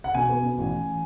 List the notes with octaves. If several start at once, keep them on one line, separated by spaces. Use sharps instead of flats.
F#5
B2 G#5
B3
B2
A1
A1